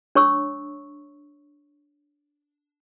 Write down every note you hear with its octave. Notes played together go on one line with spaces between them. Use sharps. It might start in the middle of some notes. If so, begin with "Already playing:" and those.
D4 C#5 C#6 E6